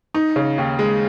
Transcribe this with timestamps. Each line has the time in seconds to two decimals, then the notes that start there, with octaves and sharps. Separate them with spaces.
0.14 D#4
0.36 C#3
0.58 D#2
0.79 G#3